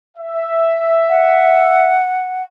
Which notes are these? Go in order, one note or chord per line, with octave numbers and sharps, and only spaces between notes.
E5
F#5